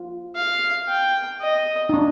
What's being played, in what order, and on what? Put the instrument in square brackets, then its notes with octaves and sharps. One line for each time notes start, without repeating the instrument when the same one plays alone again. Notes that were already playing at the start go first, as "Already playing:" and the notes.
Already playing: [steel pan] F4
[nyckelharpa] F5
G5
D#5
[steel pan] D#4
D4